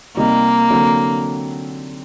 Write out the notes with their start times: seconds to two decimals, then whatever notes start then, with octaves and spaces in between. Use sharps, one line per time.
0.17 C3 G3 A#3 C4 D#4 G4
0.70 D3 F#3 C4